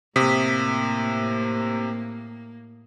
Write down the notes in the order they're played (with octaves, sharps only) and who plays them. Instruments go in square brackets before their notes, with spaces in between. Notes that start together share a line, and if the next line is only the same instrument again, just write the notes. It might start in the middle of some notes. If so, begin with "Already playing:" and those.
[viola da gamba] A2 A#3 [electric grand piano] C3 D#6 B6